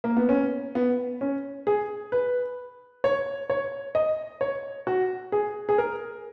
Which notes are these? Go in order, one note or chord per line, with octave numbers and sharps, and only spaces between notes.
A#3
B3
C#4
B3
C#4
G#4
B4
C#5
C#5
D#5
C#5
F#4
G#4
G#4
A#4